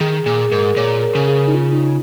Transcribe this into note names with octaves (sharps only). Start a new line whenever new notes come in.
D#3 G#4
A#2 G#4
G#2 A#4
A#2 C#5
A#4
C#3
G#4
D#4
F4
D#4